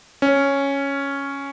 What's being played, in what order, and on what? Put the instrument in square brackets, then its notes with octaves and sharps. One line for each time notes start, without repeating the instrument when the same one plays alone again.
[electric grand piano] C#4